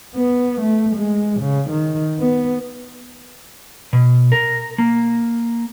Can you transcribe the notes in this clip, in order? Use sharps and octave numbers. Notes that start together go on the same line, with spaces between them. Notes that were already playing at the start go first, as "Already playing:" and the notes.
B3
A3
G#3
C#3
D#3
B3
B2
A#4
A#3